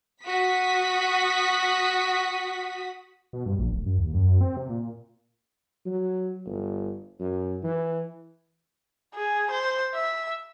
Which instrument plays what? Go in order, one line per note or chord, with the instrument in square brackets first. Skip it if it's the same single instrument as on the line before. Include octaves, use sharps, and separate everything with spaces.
[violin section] F#4 D#6 B6
[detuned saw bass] B2
G2
A#1
D1
F#2
D#2
F#2
C4
C3
A#2
[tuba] F#3
G1
F#2
E3
[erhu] G#4
C5
E5